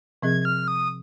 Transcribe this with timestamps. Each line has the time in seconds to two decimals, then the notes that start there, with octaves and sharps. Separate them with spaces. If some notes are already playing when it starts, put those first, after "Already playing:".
0.22 C3 F3 C4 G#4 D#5 G#6
0.41 G#6
0.45 F6
0.68 D#6